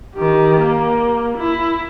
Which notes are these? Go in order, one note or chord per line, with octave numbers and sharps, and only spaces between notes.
D#3 G4
A#3
E4